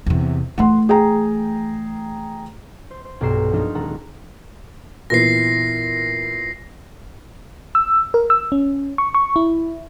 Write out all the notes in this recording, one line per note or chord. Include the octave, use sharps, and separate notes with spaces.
E2 C3
E3 A3 F#5 C6
G#4 G5 A#5
C5
C5
B1 G2 G4 A#5 C7 E7
F3 A#3 D4 D#4
D#1 G#3 A4 F#5 A#5
A#2 E3 B3 A#6 C7
E6
A#4
E6
C#4
C#6
C#6
E4